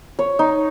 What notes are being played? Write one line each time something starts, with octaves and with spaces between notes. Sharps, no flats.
C#5
D#4